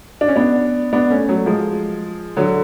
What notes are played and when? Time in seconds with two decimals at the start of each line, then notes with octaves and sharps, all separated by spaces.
0.21 D4
0.28 C#4
0.36 B3 D4
0.93 B3 D4
1.10 A3 C#4
1.29 F#3 A3
1.46 F3 G#3
2.37 D3 F#3